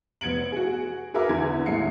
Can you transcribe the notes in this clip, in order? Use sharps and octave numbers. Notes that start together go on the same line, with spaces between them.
F1 B3 G#6 C#7 D7 F#7
F#4 G#4
F#4 G#4 A#4 B4 E5 D6
E2 D3 G#6
A1 D#2 G#3 A3 C7 C#7